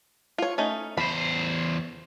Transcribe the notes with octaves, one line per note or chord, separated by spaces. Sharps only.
F4 C#5
A3 C#4 D#4
E2 C5 B5